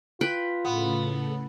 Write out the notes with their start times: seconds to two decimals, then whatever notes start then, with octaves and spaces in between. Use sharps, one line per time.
0.21 F4 B4 G5
0.65 A2 C#3 B3 A4